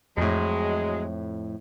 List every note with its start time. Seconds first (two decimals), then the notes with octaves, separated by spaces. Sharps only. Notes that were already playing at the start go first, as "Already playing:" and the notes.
0.17 F2 A2 F#3 G#3